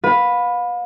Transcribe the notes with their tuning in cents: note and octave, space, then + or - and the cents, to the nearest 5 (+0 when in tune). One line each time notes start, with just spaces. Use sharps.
B4 +0 F5 +40